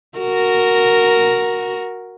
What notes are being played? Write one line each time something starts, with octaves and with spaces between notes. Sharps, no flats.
F#4 A#4